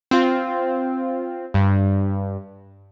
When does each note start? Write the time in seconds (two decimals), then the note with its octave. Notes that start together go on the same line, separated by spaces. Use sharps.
0.11 C4 F4
1.54 G2